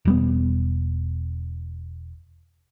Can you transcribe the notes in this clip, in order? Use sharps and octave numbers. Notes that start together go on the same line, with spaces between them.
E1 G3 B3